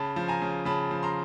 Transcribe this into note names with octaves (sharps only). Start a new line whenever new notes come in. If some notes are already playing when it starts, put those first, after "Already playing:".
Already playing: C#3 A5 B5
F3
G#5 A#5
C#3
C#3 A5 B5
F3
A#5 C6